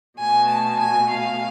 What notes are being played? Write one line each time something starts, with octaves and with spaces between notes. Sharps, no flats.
B2 A3 G#5
A5
G#5
F5